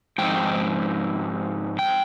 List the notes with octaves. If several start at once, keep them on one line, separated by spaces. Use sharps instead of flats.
G#2 F3 C4 D#4 G5
G5